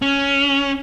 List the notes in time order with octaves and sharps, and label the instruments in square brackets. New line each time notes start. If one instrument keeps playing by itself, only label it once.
[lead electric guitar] C#4